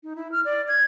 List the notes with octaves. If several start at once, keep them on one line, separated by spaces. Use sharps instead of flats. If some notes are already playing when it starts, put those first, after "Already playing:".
D#4
E4
F6
D5
G#6